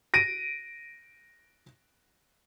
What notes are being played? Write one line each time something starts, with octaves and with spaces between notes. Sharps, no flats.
A#6 D7 D#7